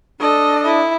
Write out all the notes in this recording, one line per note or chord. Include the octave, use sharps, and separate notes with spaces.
D4 A4 D#5
E4